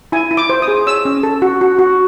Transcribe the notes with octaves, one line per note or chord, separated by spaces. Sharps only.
E4 G#5
E4
D6
C5
D#6
G#4
C#5 E6
C#4
A4
F#4
F#4
F#4